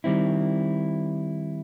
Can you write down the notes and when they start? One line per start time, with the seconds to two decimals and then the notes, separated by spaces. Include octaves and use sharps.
0.04 D#3 G3 C4 E4